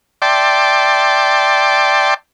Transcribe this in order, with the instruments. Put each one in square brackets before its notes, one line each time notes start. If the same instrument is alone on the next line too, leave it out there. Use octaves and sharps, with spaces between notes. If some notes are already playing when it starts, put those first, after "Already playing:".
[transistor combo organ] D5 E5 G5 A5 C6 D6